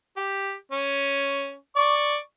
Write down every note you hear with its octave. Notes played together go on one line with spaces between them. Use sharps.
G4
C#4
D5 C#6